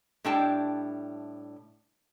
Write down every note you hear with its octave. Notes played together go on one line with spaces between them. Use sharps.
A2 G3 D4 E4 G5 A5